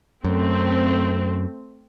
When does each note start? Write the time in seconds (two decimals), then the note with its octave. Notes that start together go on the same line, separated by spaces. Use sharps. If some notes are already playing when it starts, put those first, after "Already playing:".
0.25 F#2 A3 C4